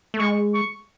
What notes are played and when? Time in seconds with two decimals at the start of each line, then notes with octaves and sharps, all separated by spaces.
0.14 A3
0.19 G#3 C#6
0.54 C#6